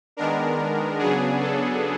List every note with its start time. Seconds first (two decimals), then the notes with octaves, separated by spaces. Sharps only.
0.17 D#3 G#3 B3 D4 A#4
0.99 C#3 F#3 B3 D4 G#4
1.40 A4